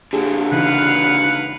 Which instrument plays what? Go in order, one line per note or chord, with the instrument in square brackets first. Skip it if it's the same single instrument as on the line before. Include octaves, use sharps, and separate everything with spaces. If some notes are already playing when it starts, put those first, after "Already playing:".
[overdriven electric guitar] A#2 D3 [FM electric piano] G4 G#4
[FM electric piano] C#3 E3 D#4 [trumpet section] B4 F5 F#5